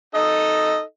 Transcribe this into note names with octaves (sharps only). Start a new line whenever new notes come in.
D#4 A4 D#5